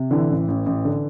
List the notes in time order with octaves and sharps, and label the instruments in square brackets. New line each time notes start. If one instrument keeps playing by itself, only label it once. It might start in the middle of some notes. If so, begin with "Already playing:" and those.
Already playing: [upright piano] C3
[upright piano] D3 [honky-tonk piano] E3
[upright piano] A1
A1
A1
D3